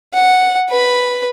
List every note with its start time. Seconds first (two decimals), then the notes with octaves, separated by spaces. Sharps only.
0.13 F#5
0.69 B4 B5